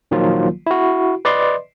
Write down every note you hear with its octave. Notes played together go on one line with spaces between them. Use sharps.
A#1 D#3 F3 F#3 A#3 F4
E4 F#4
B4 D5 D#5 C6